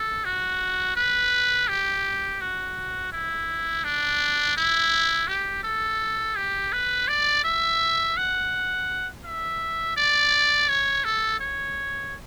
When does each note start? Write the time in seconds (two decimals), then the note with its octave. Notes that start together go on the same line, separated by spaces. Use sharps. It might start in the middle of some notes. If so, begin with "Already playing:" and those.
Already playing: A4
0.25 F#4
0.96 B4
1.68 G4
2.41 F#4
3.12 E4
3.84 D4
4.57 E4
5.28 G4
5.64 A4
6.36 G4
6.73 B4
7.08 D5
7.44 E5
8.17 F#5
9.24 E5
9.97 D5
10.69 C#5
11.05 A4
11.40 C#5